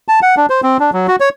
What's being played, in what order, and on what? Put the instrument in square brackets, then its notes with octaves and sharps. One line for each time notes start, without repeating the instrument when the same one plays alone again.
[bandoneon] A5
F#5
D4
C5
C4
D4
F#3
F#4
C#5